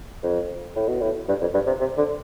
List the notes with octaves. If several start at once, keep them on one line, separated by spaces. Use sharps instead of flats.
F2
A2
B2
A2
G2
F2
G2
C3
C3
D3